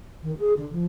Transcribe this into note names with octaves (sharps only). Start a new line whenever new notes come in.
D#3
G#4
D3
F3